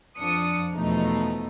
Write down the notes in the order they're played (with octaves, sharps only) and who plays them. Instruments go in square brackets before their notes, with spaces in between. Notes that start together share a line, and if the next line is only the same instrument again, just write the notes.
[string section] F2 F3 D4 D#6 C#7
E2 B2 F3 A3 D#4